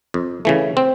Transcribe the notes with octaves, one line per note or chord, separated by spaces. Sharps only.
F2
C#3 E3 A3
C4